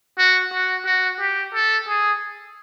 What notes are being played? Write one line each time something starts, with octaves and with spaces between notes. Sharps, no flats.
F#4
F#4
F#4
G4
A4
G#4